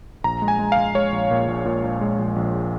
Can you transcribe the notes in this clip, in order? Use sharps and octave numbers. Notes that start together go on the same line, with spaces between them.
A#1 A#5
G#3
G#5
G#3
F5
G#3
G#3 C#5
A#1
A#2
A#1
A#2
A#1
G#3
A#1
A#1